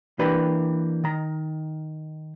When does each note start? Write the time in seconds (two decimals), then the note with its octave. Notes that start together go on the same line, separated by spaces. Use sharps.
0.19 E3 A#3 D4 G4 B4
1.04 D#3 A#5